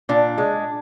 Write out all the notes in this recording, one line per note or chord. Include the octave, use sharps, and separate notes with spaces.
A#2 D4
G#3